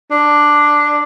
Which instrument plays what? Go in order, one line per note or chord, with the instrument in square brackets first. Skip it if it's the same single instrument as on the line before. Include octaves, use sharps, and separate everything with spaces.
[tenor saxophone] D4